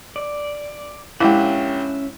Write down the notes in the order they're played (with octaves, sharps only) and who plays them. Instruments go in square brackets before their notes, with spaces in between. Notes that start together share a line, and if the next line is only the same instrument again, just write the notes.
[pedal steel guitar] D5
[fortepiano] A#1 G4 [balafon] G#3 E4 [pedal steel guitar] C#4 E5 F#5